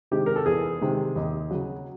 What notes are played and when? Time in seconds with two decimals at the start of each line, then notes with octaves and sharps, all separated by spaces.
0.11 C3 D#3 G#3 G4
0.26 A#4
0.36 A4
0.46 E2 G#4
0.81 C3 D#3 G#3
1.16 D#2
1.51 C#3 F#3